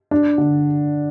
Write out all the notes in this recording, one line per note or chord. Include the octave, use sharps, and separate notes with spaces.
D4
D3